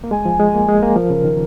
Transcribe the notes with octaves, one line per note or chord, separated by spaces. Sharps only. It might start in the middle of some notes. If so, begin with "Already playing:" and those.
A#3
G#3 G#5
F3
G#3
A#3
G#3
A#3
F3 A#4
C#3
D#3